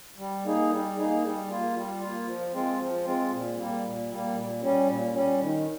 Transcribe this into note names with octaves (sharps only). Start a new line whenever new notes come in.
G3
A#3 D#4 G#4
G3
A#3 D#4 G#4
G3
A#3 F4
G3
A#3 F4
F3
G#3 C4 F4
F3
G#3 C4 F4
A#2
G3 A#3
A#2
G3 A#3
A#2
G3 C#4
A#2
G3 C#4
D#3